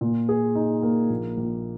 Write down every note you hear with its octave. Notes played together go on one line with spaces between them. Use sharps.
A#2
G#4
D#4
A#3
A#1
A#1